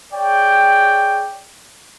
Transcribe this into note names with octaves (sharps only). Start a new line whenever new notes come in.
G#4 C#5 D5 G5